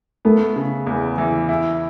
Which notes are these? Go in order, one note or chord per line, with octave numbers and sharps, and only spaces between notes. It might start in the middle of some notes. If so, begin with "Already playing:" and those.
A3 B3
C#3
E2
E3
E4